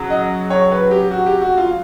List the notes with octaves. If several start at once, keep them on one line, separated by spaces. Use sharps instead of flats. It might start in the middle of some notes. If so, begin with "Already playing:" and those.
Already playing: C#3 F#3
D#5
C#5
B4
G4
F#4
G4
F#4
F4